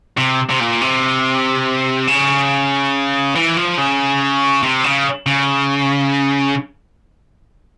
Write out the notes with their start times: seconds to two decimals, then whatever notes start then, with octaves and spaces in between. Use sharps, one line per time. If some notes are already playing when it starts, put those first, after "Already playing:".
0.17 C3
0.49 C3
0.60 A#2
0.81 C3
2.08 C#3
3.35 E3
3.57 F3
3.78 C#3
4.63 C3
4.84 C#3
5.26 C#3